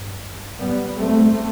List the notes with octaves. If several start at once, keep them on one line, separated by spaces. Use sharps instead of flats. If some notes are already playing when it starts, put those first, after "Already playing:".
Already playing: G2
G3 B3
A3 C4